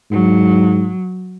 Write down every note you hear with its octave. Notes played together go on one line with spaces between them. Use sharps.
G#2 F#3